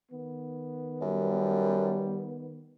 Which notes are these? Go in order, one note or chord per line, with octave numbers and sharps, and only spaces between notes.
D#3 B3
F#2 G3